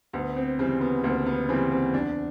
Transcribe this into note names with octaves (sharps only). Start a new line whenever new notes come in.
D2 B3
C4
C#3 E3 G3 C4
B3
D2 A#3
B3
C#3 E3 G3 C4
C4
E2 D4